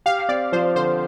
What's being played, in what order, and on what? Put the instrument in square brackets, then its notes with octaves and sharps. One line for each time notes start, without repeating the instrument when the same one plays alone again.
[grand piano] G4 [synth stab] F5
[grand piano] C4 [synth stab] D5
[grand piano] F3 [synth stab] C5
[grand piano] D3 [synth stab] C5